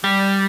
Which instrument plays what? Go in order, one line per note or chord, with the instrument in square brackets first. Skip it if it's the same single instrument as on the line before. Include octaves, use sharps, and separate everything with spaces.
[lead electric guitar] G3